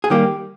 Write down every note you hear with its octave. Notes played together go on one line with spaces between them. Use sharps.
G#4
D#3 G3 A#3 G4